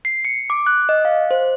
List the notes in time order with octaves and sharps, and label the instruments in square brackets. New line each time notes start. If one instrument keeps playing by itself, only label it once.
[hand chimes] C7
C#7
D6
F#6
D#5
F5
C5